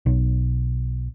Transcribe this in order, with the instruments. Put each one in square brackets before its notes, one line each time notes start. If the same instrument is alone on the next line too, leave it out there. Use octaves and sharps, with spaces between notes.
[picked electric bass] B1